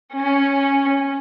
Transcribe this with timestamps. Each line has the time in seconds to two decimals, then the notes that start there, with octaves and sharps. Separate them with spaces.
0.12 C#4